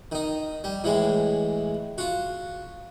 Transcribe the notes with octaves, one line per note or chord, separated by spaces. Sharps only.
D#3 D#4
G3
A2 E3 G#3
F4 F#4